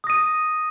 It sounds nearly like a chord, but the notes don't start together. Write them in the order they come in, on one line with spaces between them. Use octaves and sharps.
D#6 A#6 D#7